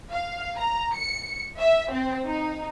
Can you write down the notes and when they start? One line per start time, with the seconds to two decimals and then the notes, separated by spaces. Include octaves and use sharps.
0.11 F5
0.57 A#5
0.93 C#7
1.58 E5
1.91 C4
2.27 D#4